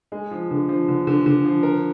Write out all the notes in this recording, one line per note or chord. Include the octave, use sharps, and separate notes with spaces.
G#3
F3
D3
F3
D3
D3
D3
F3
A#4